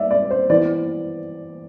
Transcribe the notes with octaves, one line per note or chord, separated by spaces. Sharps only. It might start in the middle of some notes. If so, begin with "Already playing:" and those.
Already playing: G3 D5 E5
D5
C5
E3 B3 D5